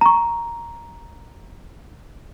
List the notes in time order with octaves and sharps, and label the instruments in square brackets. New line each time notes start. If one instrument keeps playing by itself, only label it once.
[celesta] A#5 C#6